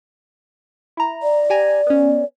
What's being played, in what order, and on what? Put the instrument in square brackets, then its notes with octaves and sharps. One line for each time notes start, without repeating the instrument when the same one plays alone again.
[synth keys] E4 A#5
[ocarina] D5
[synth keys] G4 G#5 A#5
B3 C#4